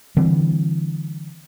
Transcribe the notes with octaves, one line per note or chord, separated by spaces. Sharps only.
D3 E3 G3 C4